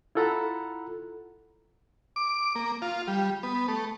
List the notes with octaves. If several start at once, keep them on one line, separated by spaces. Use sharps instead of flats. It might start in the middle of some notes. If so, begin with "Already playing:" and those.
E4 F4 A4 F#5 A#5 B5
D6
A#3
F4
G3
B3
A3